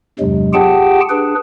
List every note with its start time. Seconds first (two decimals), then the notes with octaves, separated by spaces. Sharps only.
0.19 E2 G2 C3 F#3 G#3
0.53 F4 G4 G#4 F#5 G5 A5
1.09 D4 G#4 B4